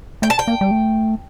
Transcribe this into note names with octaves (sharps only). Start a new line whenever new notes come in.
A3 G5
A5
G5
A#3
G3
A3